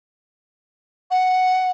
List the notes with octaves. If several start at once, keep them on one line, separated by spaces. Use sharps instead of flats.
F#5